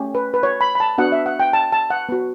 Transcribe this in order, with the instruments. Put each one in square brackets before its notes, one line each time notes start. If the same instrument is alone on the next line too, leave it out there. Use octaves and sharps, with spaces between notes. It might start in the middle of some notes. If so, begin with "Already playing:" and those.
Already playing: [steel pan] A3 C#4 G4
B4
B4
C#5
B5
B5
A5
B3 D4 F#4 F#5
E5
F#5
G5
A5
A5
F#5
B3 F#4